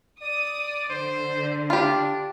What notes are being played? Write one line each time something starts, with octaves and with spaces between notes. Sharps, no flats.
D5 D#6
D3 C5
D4 F4 G4